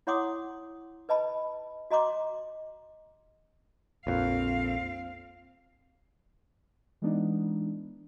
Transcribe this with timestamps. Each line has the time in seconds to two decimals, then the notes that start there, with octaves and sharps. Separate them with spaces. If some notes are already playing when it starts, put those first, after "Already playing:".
0.07 E4 C#5 F#5 C6 D6 D#6
1.09 B4 D#5 A5 B5
1.91 F#4 D#5 A#5 C6 D6
4.07 A#1 F2 C4 F5
7.02 E3 G#3 B3 D4 D#4